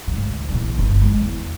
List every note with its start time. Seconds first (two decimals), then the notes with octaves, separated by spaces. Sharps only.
0.07 D2 G#2
0.48 A#1 E3
0.79 G1 E2
1.02 G#3
1.22 E2